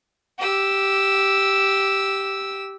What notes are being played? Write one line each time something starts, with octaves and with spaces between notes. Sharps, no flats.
G4 E6